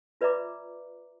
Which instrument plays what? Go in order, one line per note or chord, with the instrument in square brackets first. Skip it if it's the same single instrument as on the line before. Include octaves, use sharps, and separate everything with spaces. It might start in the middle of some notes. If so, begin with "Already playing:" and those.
[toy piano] F4 B4 D5 E5 A#5 D6